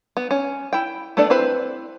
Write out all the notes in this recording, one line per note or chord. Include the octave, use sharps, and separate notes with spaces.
B3
C#4
E4 G5
A3 B3 D4 A4 D5
C4 E4 B4 C5